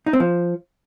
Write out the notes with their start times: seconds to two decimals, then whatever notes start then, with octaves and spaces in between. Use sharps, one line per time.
0.06 D#4
0.13 C4
0.20 F3